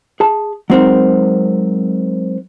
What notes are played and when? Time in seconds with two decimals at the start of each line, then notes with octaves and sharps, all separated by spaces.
0.20 G#4 A5
0.70 F#3 G#3 C4 D#4 A#4